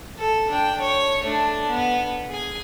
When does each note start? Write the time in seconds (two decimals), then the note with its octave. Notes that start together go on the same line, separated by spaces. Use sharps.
0.18 A4
0.51 D4 G5
0.81 C#5
1.24 A3 D4
1.69 B3
2.30 G#4 G#5